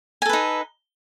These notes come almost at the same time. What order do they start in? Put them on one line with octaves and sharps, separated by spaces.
G#5 A4 B4 D#4